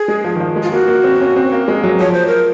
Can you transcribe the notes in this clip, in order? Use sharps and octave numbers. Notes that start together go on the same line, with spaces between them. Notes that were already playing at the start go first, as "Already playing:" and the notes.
Already playing: G#4
G#3
F3
D#3
F3
G#3
F4
A#3 F#4
A#3
C4
C#4
C4
A#3
G#3
F#3
F3 C#5
C5
A#4